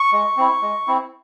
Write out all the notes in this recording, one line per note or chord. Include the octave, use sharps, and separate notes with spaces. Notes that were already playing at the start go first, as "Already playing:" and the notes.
Already playing: C#6
G#3
C4 E4
G#3
C4 E4